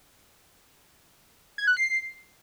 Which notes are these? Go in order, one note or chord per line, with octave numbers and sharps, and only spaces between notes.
G#6
F#6
C7